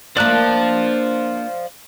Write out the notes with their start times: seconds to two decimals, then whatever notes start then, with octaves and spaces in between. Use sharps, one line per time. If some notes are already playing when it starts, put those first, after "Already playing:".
0.17 A#3 D4 C5 D5 F5 F#6